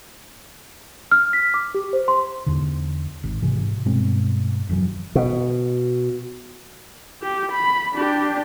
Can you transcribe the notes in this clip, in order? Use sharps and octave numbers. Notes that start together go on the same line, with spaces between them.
F6
B6
D6
G4
C5
C6
E2 D3
G#1
G#2 C3 E3
G2 B2 G#3 C4
F1 F#2 E3 F#3
B2
G4
B5
D4 G4